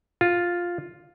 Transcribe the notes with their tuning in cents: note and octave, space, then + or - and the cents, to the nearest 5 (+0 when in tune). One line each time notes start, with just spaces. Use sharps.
F4 +5